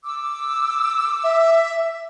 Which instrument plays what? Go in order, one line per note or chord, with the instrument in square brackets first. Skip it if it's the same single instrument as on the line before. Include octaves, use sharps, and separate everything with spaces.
[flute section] D6 E6
[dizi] E5